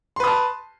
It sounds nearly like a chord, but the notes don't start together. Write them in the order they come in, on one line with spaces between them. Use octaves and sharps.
C6 B4 D#6 A5